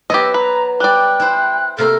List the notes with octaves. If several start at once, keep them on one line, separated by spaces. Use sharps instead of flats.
F#3 B3 G4 D#5 E6
B4 A#5
G3 D5 G5 F#6
E4 C5
C3 A#3 A4 A#4 F6